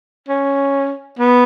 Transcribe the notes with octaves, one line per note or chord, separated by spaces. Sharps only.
C#4
B3